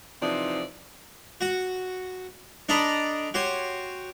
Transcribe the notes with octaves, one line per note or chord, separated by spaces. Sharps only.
C3 E3 F3 D#4 D5
F#4 F#5
D4 A4 D5 D#5 A#5 B5
F#4 G4 C#5 C6